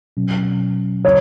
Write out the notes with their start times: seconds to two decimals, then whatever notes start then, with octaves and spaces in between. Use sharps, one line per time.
0.17 B2 F#3 C#4
1.05 C#3 F#3 C#5